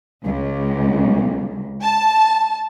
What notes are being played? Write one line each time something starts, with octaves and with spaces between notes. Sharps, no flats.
C#2
A5